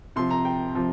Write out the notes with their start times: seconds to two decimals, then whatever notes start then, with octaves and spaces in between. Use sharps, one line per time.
0.16 C3 F3 C6
0.31 A#5
0.45 G5
0.75 C3 F3